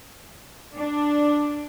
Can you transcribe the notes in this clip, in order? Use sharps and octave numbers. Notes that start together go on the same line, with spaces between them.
D4